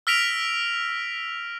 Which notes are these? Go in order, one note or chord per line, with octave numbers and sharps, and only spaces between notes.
E6 F6 A#6 B6 D7 F7